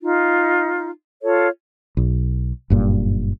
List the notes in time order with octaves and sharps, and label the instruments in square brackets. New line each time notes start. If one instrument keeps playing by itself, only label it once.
[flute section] D#4 F4
F4 A4 C#5
[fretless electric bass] B1
F#1 G2 A#2